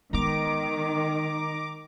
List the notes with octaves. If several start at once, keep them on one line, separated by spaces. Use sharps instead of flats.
D#3 G#3 B3 A#5 D6